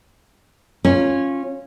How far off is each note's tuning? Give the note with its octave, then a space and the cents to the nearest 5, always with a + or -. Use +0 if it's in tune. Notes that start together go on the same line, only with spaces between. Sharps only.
C#4 -15 F4 +0